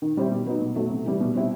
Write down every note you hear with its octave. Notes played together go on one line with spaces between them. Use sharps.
D#3
G3 C4 E4
B2
F#3 B3 D#4
B2
F#3 A3
C3
E3 G3
B2
G3 C4 E4